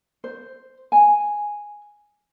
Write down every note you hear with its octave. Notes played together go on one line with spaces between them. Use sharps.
C5
G#5